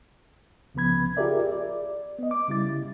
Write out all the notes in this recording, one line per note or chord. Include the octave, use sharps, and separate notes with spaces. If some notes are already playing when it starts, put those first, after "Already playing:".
C#2 C#3 F3 B3 B5 G#6
F4 G4 G#4 A#4 D5 E5
D5
B3 D#5
D6
C#3 G3 E4 A6